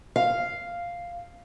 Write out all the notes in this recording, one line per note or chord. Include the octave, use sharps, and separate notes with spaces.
F5